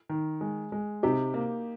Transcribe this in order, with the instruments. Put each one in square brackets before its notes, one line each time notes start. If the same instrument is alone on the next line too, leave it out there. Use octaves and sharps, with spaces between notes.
[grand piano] D#3
G#3
G#3
[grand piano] C3 [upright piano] D#4 G4
[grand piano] A#3